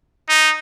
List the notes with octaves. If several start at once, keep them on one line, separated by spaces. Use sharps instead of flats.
D#4